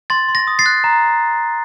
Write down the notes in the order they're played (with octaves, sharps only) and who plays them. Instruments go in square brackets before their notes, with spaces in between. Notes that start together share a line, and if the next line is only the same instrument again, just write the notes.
[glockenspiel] C6 A6
C6
A#6
D#6
A6 C7
F#6
A#5